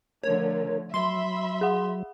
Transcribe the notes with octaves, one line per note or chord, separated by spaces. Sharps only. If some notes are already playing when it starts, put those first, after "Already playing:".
D3 F3 A3 A#4 C#5
F#3 E5 B5 C6 C7
G#4 F#5